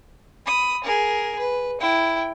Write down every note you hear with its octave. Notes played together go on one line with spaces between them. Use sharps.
B5 D#6
G#4 A#4
B4
E4 G5